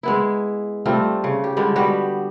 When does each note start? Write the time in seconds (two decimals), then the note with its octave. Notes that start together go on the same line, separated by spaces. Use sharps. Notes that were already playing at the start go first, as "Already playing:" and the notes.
0.03 G#3 B3 E4
0.85 G3 A3 C4 F4
1.24 C#3
1.44 G4
1.57 D3 G3 G#3
1.76 G3 B3 F#4 G4